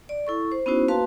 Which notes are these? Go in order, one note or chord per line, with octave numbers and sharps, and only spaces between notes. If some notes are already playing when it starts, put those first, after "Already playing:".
D5
E4 A4 C#6
C5
B3 C#4 D#4 E4 F#4 C5
A#3 F#4 B4 F5 A5 C6